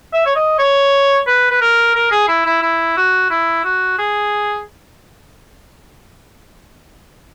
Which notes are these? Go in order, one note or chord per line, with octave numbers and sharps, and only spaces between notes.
E5
C#5
D#5
C#5
B4
B4
A#4
A#4
G#4
E4
E4
E4
F#4
E4
F#4
G#4